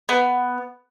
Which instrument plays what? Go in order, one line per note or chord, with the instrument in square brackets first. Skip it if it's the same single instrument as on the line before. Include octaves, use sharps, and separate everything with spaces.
[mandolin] B3